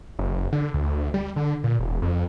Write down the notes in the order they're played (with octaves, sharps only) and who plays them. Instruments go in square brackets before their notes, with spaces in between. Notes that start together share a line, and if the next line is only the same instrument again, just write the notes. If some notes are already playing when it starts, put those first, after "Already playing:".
[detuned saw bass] F#1
D3
D2
G3
D3
A#2
E1
F2